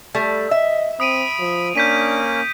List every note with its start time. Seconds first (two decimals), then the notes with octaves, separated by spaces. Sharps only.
0.14 G3 A3
0.51 D#5 E5
1.00 C4 B5 D#6 D7 D#7
1.40 F3
1.75 A#3 C#4 D4 G6 B6 D#7